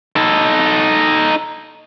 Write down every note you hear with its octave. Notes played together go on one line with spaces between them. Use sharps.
D#4 A4